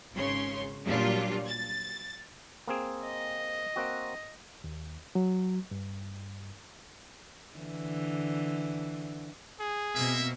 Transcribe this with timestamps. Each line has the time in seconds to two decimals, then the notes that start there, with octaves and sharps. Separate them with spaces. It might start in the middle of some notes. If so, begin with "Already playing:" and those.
0.13 G#1 C#3 C#5 C6
0.85 A#2 F#3 G3 D4 F4
1.48 A6
2.67 A#3 C4 G#4
3.04 D#5
3.76 A#3 C4 F#4
4.64 D#2
5.15 F#3
5.71 G2
7.57 D3 E3
9.60 G#4
9.95 B2 A#3 C4 E5